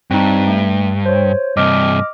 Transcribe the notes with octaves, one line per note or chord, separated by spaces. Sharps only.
G2 C4 D#4
A3
C5 C#5
G2 C3 D#5 D6 F6